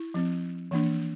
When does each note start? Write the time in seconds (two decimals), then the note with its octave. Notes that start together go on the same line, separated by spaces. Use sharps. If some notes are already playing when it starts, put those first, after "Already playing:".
Already playing: E4
0.14 F3 C4
0.71 E3 A#3 D4